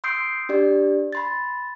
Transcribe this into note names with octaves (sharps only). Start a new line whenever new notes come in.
C6 D#6 E6 G6 C7 D7
D4 G4 D5
B5 C6 A6